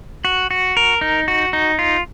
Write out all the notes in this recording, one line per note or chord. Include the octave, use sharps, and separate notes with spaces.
F#4
F#4
A#4
D#4
F#4
D#4
F4